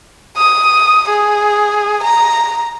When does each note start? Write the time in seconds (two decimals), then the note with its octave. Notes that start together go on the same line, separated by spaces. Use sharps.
0.37 D#6
1.09 G#4
2.03 A#5